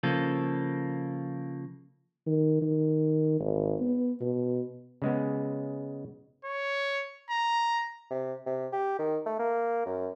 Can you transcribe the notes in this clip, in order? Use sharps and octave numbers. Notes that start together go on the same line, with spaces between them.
C#3 F3 A#3 A4
D#3
D#3
G#1
B3
B2
C#3 G#3 B3
C#5
A#5
C3
C3
G4
D#3
A3
A#3
F#2